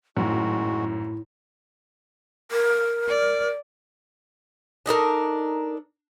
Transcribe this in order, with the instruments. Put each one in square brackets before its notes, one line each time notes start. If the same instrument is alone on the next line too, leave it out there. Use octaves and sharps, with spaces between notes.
[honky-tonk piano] G#1 F#2 [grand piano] A2 [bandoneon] G#3 F#4 [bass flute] E4
[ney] A#4
[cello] D5
[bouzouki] D4 D#4 A4 A#4